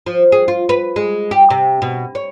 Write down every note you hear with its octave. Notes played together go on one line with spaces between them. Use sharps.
F3
G#4
F4
B4
G#3
G4
C3
B2
C#5